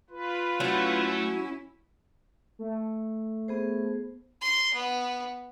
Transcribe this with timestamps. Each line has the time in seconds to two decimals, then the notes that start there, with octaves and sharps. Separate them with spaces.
0.10 F4 B4
0.60 F#3 A3 C#4 E4
2.59 A3
3.48 B3 G#4 C5
4.42 C6
4.74 B3